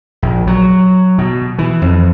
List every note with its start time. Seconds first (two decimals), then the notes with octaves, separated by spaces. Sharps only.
0.22 A#1
0.47 F#3
1.18 B2
1.58 E3
1.82 F2